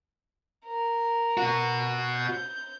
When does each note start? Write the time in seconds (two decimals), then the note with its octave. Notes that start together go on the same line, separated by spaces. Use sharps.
0.65 A#4
1.37 B2 F#4
2.15 G6